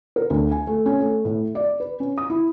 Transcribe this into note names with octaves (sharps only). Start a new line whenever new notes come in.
A#4
D2
G#5
A3
C#4
A3
A2
D5
B4
C#4
D#6
E4